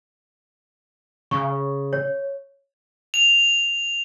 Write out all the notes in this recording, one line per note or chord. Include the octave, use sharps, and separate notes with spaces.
C#3 C#6
C#5
F7